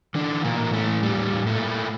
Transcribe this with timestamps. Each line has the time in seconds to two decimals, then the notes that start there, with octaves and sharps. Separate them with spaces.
0.15 D3 E3 D4
0.44 A#2 A#3
0.59 A2
0.73 A3
1.03 A#2 G3
1.47 A#2 A3